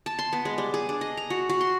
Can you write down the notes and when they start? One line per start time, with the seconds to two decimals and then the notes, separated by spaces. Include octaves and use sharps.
0.06 A5
0.19 C6
0.33 B3
0.45 G#3
0.58 G3
0.74 G#4
0.89 D4
1.01 D#5
1.17 A#5
1.30 F#4
1.49 F#4
1.61 C6